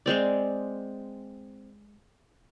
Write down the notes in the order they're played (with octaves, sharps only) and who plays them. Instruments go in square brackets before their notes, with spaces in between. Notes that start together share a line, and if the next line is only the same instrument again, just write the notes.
[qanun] G#3 C4 D5